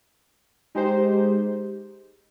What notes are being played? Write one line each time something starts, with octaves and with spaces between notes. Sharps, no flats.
G#3 D#4 G4 C5